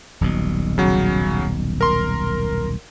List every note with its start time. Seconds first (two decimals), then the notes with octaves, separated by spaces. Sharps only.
0.21 D#1 B1 B2
0.78 C#3 F#3
1.81 A#4 C6